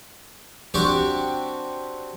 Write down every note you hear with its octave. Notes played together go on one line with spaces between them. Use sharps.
C4 D4 F#4 G4 C#6 D6